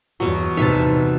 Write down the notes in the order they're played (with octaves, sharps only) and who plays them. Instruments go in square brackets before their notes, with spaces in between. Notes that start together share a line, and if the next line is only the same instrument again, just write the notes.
[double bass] E2 G2 [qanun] B2 F#3
[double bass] E2 C3 [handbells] D#4 F#4 B4 [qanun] E5 A5